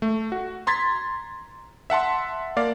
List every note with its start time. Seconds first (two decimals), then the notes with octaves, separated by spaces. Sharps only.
0.02 A3
0.32 F#4
0.67 A#5 C6 G#6 A6 B6
1.90 E5 F#5 A5 C6
2.57 A#3 D5 F5